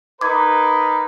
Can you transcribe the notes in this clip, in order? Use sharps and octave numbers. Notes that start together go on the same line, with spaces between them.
D#4 A#4 B4 D6 G#6